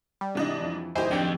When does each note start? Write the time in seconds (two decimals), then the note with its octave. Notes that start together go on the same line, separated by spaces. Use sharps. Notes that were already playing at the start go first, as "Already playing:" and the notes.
0.21 G3
0.35 G#2 C3 E3 D4 D#5
0.61 F2 E3
0.95 D1 D#3 D#4 E4 G4 C5 D#5 G#5
1.11 F2 D4 G4 G5